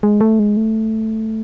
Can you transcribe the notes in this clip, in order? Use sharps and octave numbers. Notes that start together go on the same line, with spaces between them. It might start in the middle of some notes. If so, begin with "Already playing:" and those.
G#3
A3
G#3
A3